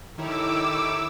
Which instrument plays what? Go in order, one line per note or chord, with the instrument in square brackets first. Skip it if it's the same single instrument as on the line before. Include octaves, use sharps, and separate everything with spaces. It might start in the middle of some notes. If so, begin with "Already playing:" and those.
[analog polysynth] D#3 E4 C#5 [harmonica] G4 A4 A#4 [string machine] D6 E6